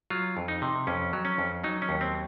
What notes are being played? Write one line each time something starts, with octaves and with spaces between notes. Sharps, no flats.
F#3 F4
F2
D#4
C3
F2 C#4
F#3
C#4
F2
F#3 D#4
C#4
D#2
C4